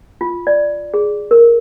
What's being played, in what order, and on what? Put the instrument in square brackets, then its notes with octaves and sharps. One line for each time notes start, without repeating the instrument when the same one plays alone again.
[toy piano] F4
D5
G#4
A#4